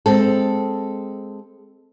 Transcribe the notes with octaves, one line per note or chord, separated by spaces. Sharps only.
G#3 C4 A4